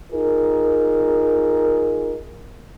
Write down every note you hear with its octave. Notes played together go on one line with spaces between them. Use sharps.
D#4 F4 G#4 A#4